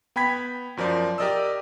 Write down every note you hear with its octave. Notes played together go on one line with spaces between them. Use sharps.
B3 G5 B5 G#6 B6
F#2 F3 A#4 D5
G4 A#4 D5 D#5 D#6 E6